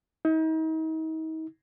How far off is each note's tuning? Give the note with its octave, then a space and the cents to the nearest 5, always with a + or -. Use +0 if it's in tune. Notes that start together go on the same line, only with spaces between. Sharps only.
D#4 +40